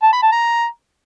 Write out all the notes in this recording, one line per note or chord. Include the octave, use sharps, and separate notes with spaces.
A5
B5
A5
A#5